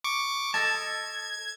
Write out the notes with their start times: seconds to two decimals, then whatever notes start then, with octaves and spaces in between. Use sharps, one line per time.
0.04 C#6 D6
0.54 A4 D#5 A5 G#6